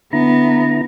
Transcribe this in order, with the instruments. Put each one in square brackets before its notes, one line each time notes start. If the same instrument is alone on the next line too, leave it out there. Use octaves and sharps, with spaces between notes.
[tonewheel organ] D3 E4 A#5 [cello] B3